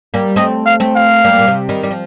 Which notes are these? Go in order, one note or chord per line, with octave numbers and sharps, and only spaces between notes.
G3 A#3
A3 C4 D#5
F5
A3 C4
F5
G3 A#3
A#2
C3
D#3 G3
G3
F3